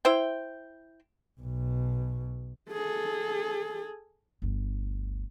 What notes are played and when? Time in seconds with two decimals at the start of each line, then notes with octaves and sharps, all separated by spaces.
0.05 E4 C5 G5
1.40 B1 B2
2.71 G#4 A4
4.42 G1 D2